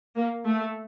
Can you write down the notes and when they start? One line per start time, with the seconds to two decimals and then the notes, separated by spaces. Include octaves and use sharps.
0.16 A#3
0.45 A3